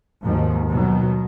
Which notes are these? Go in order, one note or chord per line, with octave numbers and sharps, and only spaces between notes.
G#1 D#2 G#2 D#3 F3
B2 D#3 F#3